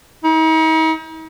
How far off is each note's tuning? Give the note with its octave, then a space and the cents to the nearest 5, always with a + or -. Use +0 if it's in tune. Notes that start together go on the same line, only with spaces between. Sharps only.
D#4 +40